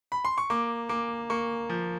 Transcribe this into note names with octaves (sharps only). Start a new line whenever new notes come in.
B5
C6
C#6
A#3 D6
A#3 D6
A#3 C#6
F3